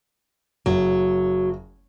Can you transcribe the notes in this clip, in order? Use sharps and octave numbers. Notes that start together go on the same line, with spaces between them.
F#1 F#3